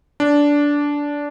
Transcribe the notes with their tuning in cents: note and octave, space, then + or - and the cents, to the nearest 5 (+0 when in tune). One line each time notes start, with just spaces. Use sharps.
D4 -15